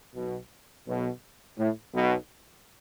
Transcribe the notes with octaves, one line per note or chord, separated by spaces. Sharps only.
B1 B2
B1 B2
A2
B1 B2